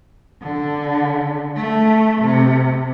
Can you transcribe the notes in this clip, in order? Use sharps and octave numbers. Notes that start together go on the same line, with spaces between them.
D3
A3
C3